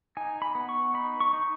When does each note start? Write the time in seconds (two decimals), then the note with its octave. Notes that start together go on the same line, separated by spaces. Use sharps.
0.17 D#4 G#5
0.42 B5
0.55 B3
0.69 C#6
0.94 D#4 B5
1.20 C#6
1.33 D#4